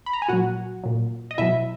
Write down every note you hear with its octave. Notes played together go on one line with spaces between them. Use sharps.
B5
A#5
G#5
A#2 F#3 F#4 F#5
A#2 F#3
D#5
B2 F#3 E4 E5